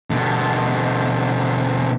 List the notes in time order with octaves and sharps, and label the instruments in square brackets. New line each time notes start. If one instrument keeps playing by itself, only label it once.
[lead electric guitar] B2 D3